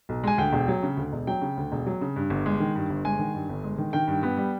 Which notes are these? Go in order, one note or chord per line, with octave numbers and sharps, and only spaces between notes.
B1
G#3 G#5
D2 G5
E1
F#3
C#3
D2
E1
F#3 G5
C#3
D2
E1
F#3
C#3
G2
G1
G#3
D#3
G2
G1
G#3 G#5
D#3
G2
G1
G#3
D#3
D#3 G5
G2
B3
G3